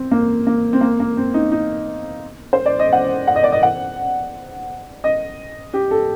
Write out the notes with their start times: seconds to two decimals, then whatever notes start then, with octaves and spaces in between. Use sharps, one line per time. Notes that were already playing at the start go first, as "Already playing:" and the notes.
Already playing: C4
0.11 A#3
0.47 A#3
0.73 C4
0.81 A#3
1.00 A#3
1.17 C4
1.34 D#4
1.52 D#4
2.53 C5
2.66 D5
2.79 D#5
2.92 F#5
3.27 F#5
3.36 D#5
3.44 D5
3.52 D#5
3.63 F#5
5.04 D#5
5.74 G4
5.91 A4